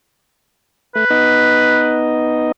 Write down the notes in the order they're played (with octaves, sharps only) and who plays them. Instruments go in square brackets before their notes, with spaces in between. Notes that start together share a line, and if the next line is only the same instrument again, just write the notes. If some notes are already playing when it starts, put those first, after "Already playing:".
[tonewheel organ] A3 [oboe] B4
[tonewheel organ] B3 D#4 D#5